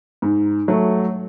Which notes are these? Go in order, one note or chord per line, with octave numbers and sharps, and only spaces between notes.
G#2
F#3 A3